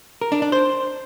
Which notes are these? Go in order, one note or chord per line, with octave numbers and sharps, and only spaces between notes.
A#4
D4
D4
C5